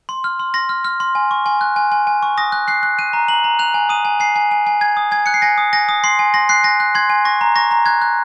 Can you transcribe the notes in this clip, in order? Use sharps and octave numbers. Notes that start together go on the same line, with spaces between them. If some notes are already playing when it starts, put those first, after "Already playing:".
C6
F6
C6
C6 A#6
F6
F6
C6
G#5
C#6
G#5
F#6
G#5
G#5
G#5
C#6
D#6 A#6
F#6
F#6 C7
F#6
F#6 D#7
A#5
A#5 F#7
A#5
F#6 F7
G#5
D#6 D#7
G#5
G#5 C7
G#5
G#5
G#5
G#5 G#6
D#6
G#5 G#6
F#6 C#7
C7
G#5 A#6
D#6
G#5 A#6
D#6
C6 C7
G#5
C6 A#6
F#6 C7
G#5 A#6
F#6
C6 G#6
G#5
C#6 A#6
A#5
C#6 A#6
A#5
F#6 G#6
F#6